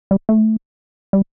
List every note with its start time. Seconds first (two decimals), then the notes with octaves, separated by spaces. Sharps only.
0.11 G3
0.29 A3
1.13 G3